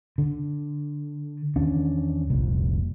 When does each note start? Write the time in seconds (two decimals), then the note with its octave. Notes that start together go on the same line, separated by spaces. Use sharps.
0.18 D3
1.56 E2 D#3 C#4 D4
2.30 F1 C2 A#2